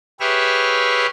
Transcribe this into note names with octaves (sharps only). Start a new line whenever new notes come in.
G4 G#4 B4 C#5 E5 F6